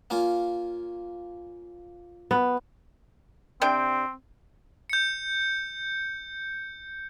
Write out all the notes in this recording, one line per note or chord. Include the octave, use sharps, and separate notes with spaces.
A#3 C#4 F4
B3
C3 C4 D4 G5
G6 C#7